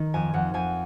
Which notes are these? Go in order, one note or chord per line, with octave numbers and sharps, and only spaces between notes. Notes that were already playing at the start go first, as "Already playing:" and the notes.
Already playing: D#3
F2 G#5
F2 F#5
F2 G#5